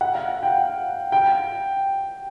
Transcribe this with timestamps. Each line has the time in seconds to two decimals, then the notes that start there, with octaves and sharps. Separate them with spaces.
0.01 F#5
0.15 F5
0.43 G5
1.12 G5